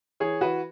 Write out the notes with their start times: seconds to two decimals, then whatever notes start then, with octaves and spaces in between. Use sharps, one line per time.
0.20 E3 G#4 C#5
0.41 E3 F#4 B4